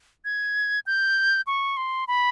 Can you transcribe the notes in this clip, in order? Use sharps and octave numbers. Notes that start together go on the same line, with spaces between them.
G#6
G6
C#6
C6
B5